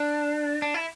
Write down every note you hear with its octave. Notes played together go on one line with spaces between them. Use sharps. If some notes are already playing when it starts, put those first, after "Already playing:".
Already playing: D4
D4
E4